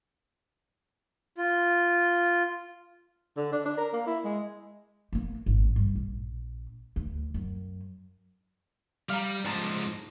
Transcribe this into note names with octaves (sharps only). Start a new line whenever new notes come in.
F4
D3
D4
D4
A#4
A#3
E4
G#3
A#3 B3
G#1
G2
A#1
D2
F#2
G3 F5 A#5
G#2 F3 A5 A#5